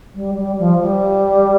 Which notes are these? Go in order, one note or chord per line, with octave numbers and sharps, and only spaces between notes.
G3
G3
F3
G3